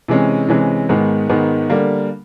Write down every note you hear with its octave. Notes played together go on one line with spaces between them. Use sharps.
C3 E3 G#3 C#4
C3 E3 G#3 C#4
G#2 D#3 G#3 B3
G#2 D#3 G#3 B3
D3 G3 A#3